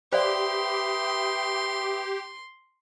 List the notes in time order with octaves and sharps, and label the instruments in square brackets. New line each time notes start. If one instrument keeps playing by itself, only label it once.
[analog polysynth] G4 [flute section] B4 E5 D#6 [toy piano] C5 D5 F5 [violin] C6